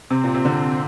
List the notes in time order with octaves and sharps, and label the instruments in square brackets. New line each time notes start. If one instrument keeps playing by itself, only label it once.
[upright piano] C3 [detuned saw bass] C4
[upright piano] A#2
C3
D3